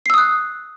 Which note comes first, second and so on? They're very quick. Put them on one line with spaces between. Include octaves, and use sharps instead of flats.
C7 E6 D#6 F#6